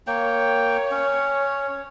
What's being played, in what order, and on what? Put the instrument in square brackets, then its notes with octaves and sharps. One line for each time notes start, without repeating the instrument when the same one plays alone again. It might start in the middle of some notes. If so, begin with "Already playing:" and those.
[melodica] A#3 G5 [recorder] C#5
[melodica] C#4